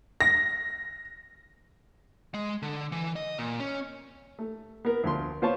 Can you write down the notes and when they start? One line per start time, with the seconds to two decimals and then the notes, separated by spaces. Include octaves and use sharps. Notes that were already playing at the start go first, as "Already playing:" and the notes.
0.21 A#6
2.34 G#3
2.62 D3
2.92 E3
3.16 D#5
3.39 A#2
3.60 C#4
4.39 A3
4.85 B3 A#4
5.04 D2 F3 C6
5.42 B3 F4 C5 C#5 A5